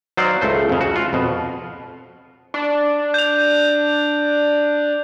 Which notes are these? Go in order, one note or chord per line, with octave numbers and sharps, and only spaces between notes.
F#3 D#4 C5 D5 F5
C#2 A3 C5
F2 C#3
F#4
F4
F2 B2
D4
G6 F7